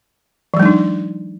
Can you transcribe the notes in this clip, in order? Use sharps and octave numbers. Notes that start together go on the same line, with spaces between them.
E3 F#3 G#3 D4 D#4